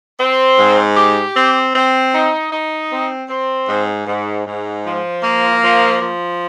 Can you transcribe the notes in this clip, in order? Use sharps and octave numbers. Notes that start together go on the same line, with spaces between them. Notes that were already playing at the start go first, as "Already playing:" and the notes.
C4
G#2
G4
C4
C4
D#4
D#4
C4
C4
G#2
G#2
G#2
F3
A#3
F3
F3